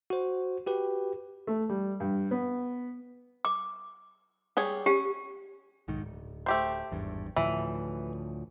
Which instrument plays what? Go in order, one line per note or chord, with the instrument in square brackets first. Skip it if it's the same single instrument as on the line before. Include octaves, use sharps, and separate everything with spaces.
[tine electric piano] F#4 C5
F#4 G4 B4
[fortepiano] A3
G3
G2
B3
[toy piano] D6
[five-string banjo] G3 G#4 C#5
[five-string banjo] C#4 [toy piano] G4
[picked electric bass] B1 G#2 D#3
D1
[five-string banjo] A3 G4 C5
[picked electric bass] G#1 E2 G2
[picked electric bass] D2 A2 F3 [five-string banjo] E3